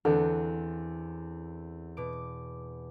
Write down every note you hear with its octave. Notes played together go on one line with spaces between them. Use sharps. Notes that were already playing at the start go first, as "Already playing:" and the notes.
E2 D3 C4
B2 D6